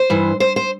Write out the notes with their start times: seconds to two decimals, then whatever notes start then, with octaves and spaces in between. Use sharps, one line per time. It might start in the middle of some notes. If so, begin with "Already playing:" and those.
Already playing: C5
0.10 G2 E3
0.40 C5
0.56 C5